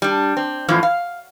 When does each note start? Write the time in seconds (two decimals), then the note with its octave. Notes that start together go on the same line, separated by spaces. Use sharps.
0.02 G3 D4
0.37 C4
0.68 F#2 A2 E3 F3
0.83 F5